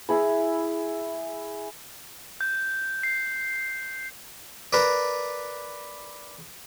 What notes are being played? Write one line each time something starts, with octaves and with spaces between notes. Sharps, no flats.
E4 G#4 B5
G6
C7
A#4 B4 D5